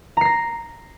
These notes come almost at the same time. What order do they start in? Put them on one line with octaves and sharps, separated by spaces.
A#5 C7 A#6